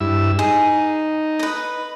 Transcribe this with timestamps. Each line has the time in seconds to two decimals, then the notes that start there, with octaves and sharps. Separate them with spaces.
0.01 G2 E4 E6
0.39 D#4 G#4
1.39 B4 D#5